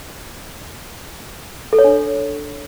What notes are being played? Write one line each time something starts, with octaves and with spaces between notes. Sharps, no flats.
A4
C#5
D4